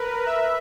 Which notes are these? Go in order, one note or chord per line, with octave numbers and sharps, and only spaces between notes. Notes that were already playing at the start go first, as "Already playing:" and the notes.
Already playing: A#4 B4
E5